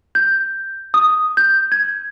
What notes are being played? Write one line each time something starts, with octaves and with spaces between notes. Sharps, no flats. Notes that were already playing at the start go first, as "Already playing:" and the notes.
G6
D#6
G6
G#6